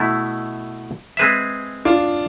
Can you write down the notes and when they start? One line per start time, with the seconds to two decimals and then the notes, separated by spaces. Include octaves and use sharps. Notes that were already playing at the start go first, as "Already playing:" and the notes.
Already playing: B2 A3 E4
1.17 G#3 C4 G#4 B4 E5
1.85 D4 F4